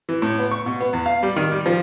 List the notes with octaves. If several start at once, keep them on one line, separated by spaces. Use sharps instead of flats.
E3
A2
B3
C#6
B2
B3
E2
F5
G3
D#3
G3
F3